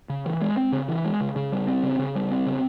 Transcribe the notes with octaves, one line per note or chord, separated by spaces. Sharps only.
C#3
E3
G#3
C4
C#3
E3
G#3
C#3
C#3
G3
C4
C#3
C#3
G3
C4
C#3